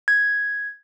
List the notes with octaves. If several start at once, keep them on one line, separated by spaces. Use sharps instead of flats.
G#6